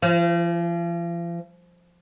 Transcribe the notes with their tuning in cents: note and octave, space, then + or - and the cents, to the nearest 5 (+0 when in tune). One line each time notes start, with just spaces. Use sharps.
F3 -40